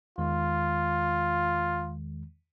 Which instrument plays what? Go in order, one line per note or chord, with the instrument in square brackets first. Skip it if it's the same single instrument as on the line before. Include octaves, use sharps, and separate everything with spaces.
[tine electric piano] E2 D#3 G#3 [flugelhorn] F4